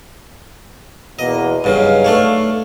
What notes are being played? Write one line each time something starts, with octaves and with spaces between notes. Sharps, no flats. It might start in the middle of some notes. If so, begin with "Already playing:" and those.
E2 B2 A#3 D#5
G2 C#3 F#3 D#4 B4 F5
A3 D4 C#5